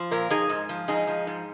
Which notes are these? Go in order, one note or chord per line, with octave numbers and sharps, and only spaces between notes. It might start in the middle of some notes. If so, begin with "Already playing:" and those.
Already playing: F3
A#2 F4 A#4
F3 D#4 G#4
G#2
F3
G#2 D#4 G#4
F3
G#2